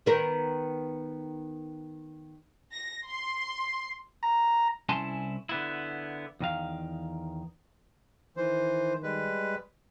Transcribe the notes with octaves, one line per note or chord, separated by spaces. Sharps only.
D#3 B3 A#4
A#6
C6
A#5
C2 C#4 E4 G#5 A5 C6
D3 B3 E4
E2 D#3 F5
D#3 E3 C5
G3 G#3 B4